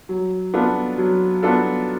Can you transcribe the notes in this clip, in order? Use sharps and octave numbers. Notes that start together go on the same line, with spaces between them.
F#3
B3 D4 F4 A4
F#3
B3 D4 F4 A4